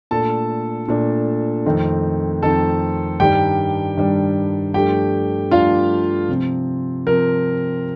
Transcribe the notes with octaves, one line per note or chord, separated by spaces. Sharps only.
A#2 A3 D4 A4 A5
A#2 A3 D4
F2 D#3 A3 C4
F2 D#3 A3 C4 A4 A5
G2 D#3 G3 D4 G4 G5
G2 D#3 G3 D4
G2 F3 A3 D4 G4 G5
G2 F3 A3 D4 F4 F5
C3 F3 C4
C3 F3 C4 A#4